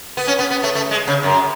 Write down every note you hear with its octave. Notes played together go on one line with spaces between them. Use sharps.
B3
C#4
B3
B3
A3
A3
G#3
C#3
F#2